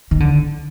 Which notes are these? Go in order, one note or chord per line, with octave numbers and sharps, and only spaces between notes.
D#3
D3